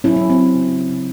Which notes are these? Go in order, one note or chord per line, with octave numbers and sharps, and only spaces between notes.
F#3 C#4 E4
F#3 C#4
C4
F#3
C#3
C#3
C#3